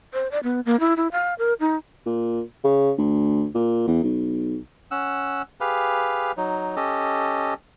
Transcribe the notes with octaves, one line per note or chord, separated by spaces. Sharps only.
C5
D5
B3
A#3
E4
E4
F5
A#4
D#4
A#2
C#3
D2
A#2
E2
B1
C#4 F#5 E6
G4 G#4 B4 F5
F#3 D#4
C#4 G4 A4 D#5